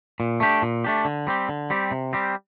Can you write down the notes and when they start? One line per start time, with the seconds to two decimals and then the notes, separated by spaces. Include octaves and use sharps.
0.20 A#2
0.40 A3 D4 G4
0.62 A#2
0.84 A3 D4 G4
1.05 D3
1.27 G3 C4 G4
1.49 D3
1.70 G3 C4 G4
1.91 C3
2.13 G3 C4 G4